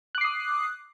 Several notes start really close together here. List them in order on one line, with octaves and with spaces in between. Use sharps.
F#6 D6 C7 D#6